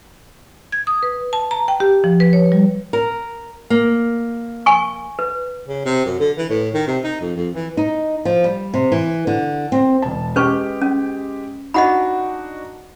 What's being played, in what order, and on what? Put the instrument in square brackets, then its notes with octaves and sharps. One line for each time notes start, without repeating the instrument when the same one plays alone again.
[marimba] G#6
D#6
B4
A5
A#5
G5
G4
F3
B4
C#5
G3
[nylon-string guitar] A#4
A#3
[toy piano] G#5 C#6
B4
[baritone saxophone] C#3
C3
F#2
D3
E3
A2
D#3
C3
D#4
F2
F2
E3
[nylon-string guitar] D#4
F3
G3
C3
E3
D3
C4
[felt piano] E1 A5
[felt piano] G#3 G4 [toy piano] C#4 B4 C#6
[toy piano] C#4
[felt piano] D4 D#4 F#4 [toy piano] D#5 F#5 B5